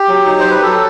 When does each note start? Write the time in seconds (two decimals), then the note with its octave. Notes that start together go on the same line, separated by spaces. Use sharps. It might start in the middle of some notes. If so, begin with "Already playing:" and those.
Already playing: G4
0.08 F#3
0.26 D#4
0.39 F#3 C5
0.51 B4
0.62 F#3 A4